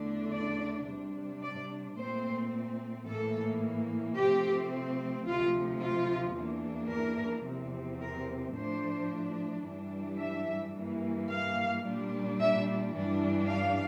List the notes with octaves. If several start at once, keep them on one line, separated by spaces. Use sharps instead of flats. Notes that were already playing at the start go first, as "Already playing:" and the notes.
Already playing: E2 D3 A3 D4
D5
C3 G3 D4
D5
A#2 A3 C4 C5
A2 E3 A#3 A4
C3 F3 A3 C4 G4
D2 C3 F3 F4
F4
E2 E3 A#3 D4
A#4
E2 C3 F3 C4
A#4
A2 F3 A3 D4 C5
G2 E3 G3 D4
E5
G2 E3 A#3
F5
A#2 G3 D4
E5
G2 E3 G3 D4
F5